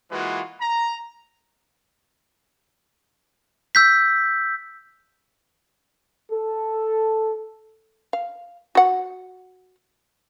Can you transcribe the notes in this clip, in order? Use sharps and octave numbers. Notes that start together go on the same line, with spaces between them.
E3 G#3 A#3 F4 F#4 B4
A#5
E6 G6 B6
A4
F5
F#4 F#5